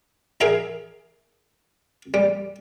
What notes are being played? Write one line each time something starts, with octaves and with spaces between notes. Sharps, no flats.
G#4 A#4 E5 F5 A#5
G3